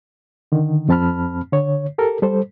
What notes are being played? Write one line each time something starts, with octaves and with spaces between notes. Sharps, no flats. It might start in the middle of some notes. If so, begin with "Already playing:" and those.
D3 D#3
F2 C4 A5 B5 F6
D3 C#5
G4 A4 A#4
G3 A4 C5